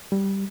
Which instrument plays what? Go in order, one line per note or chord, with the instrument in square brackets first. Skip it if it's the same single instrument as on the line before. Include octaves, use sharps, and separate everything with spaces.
[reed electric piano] G3